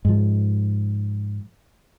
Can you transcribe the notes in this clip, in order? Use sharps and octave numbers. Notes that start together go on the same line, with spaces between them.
G#2 F3